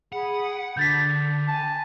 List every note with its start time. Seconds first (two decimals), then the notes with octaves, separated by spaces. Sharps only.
0.13 G#4 F#5 B5
0.77 D3 D4 G6 A6 B6
1.48 G#5 A5